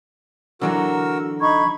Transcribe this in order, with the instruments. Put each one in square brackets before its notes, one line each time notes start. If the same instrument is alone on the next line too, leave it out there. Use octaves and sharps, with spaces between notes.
[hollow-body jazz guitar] D3 E3 F#3 [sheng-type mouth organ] F#4 A#4 E6
[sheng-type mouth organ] D#4 [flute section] B5 C#6 G#6